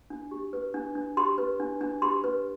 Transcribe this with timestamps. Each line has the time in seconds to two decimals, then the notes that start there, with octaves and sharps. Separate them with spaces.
0.10 D4
0.31 G4
0.53 B4
0.74 D4
0.95 D4
1.17 G4 C6
1.38 B4
1.60 D4
1.81 D4
2.02 G4 C6
2.24 B4